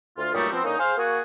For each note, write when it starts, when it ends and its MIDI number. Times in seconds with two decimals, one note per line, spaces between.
0.17 0.31 38
0.17 0.31 65
0.32 0.47 43
0.32 0.47 46
0.32 0.47 54
0.32 0.47 55
0.32 0.47 57
0.32 0.47 63
0.51 0.64 53
0.51 0.64 59
0.51 0.64 60
0.64 0.77 50
0.64 0.77 58
0.64 0.77 61
0.64 0.77 63
0.78 0.93 68
0.78 0.93 72
0.78 0.93 77
0.97 1.20 58
0.97 1.20 66
0.97 1.20 68